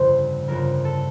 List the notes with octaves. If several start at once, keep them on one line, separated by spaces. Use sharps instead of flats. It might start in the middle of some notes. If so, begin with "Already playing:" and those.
Already playing: G1 F2 C#3 C5
G1 F2 C#3 A#4
A4